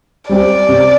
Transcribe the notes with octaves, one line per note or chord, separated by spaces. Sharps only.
G3 C4 G4 D5
C3